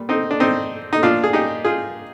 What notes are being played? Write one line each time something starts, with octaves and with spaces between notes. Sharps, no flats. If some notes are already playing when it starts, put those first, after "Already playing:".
Already playing: A#2 G3
C4 D#4
D4
C4 D#4
D#4
A#2 F3 D4 F4
G#4
D#4 G4
F4 G#4